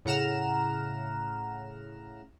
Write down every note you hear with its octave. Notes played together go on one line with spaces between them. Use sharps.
A2 C#3 F#5 A#5 F6 E7